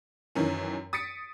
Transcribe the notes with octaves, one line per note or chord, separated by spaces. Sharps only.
F#2 D#3 E3 C#4
D#6 A6 B6 C#7 D7